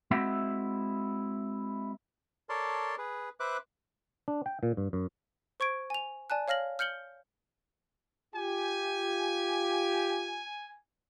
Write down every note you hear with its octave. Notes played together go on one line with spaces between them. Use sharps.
G#3 C4 E4 F#4 E5 F#5
A4 A#4 C#5 D5 A5 C6
G#4 B4
B4 C5 E5 D6 F#6
D4
G5
A#2
G2
F#2
C5 C#6 G#6 D7
G#5 F7
D5 G#5 A5 F#6
C#5 F5 F6 A#6 F#7
F6 G6 C#7 F#7 G7
F4 G4 G#5